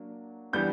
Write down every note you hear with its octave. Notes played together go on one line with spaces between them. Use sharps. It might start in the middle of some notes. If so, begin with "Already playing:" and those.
Already playing: F#3 A#3 D4
E3 G3 B3 D4 G6